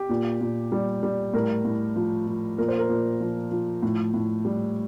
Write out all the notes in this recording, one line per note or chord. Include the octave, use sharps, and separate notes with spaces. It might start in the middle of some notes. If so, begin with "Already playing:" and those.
Already playing: G4
A#2
A#2
G3
G3
A2 A#4
A2
F3
F3
A#2 A#4
C5
A#4
A#2
F3
F3
A2
A2
G3